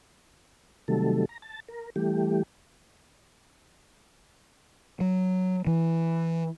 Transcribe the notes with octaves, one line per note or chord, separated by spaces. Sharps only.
C3 D#3 F#3 G3 A3 A4
A#5
A5
A#4
E3 G3 A3 G4
F#3
E3